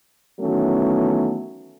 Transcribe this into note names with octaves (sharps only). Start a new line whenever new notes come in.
D#3 E3 F#3 A3 B3 C#4